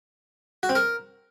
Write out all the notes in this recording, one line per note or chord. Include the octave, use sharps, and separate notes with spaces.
F#4
C4
A#4